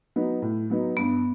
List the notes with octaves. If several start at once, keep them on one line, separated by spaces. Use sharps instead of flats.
F#3 B3 D#4
A2
F#3 B3 D#4
G2 B3